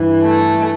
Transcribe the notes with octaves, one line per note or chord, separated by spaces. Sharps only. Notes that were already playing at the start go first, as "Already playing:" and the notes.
Already playing: G2 E3
A3